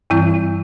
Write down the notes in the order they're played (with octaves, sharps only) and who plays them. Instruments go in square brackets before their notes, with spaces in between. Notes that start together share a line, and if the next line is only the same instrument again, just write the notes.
[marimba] G2 E3 G3 C4 E4